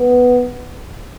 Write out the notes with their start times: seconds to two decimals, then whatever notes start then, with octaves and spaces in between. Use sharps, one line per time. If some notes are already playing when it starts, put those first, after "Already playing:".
Already playing: B3